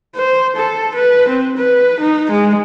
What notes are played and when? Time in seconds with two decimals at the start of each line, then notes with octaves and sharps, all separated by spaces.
0.16 C5
0.57 A4
0.95 B4
1.29 C4
1.58 B4
2.01 D#4
2.32 G#3